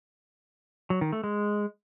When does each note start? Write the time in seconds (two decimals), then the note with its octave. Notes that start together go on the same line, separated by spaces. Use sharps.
0.90 F#3
1.01 D#3
1.12 A3
1.24 G#3